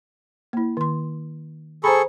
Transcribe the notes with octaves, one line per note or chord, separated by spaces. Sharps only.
A#3 E4
D#3 C6
G#4 A4 C5 A#5 B5 C#6